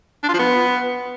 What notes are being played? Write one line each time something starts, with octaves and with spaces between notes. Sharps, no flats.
D4
F4
F3
B3